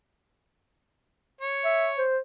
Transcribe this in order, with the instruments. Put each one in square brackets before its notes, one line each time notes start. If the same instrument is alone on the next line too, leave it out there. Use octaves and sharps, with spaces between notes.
[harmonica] C#5
[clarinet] E5
C5